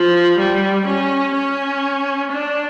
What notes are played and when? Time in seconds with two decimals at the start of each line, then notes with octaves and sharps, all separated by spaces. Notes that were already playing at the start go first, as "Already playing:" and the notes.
Already playing: F3
0.38 G3
0.87 C#4
1.35 C#4
2.31 D4